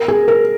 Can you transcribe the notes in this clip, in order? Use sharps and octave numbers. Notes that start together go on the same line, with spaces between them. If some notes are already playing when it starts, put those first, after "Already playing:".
Already playing: A#4
G#4
A#4